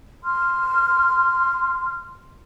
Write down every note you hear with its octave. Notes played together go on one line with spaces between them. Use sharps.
C6 F6